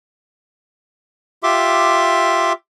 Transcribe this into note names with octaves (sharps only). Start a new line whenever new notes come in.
F4 G4 E5 C6 D6